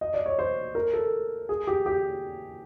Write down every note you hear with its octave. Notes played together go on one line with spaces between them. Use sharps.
D#5
D5
C#5
C5
A#4
A4
G#4
G4
G4